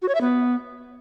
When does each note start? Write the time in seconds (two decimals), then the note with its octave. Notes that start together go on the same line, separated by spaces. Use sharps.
0.02 F#4
0.08 C#5
0.15 E5
0.21 B3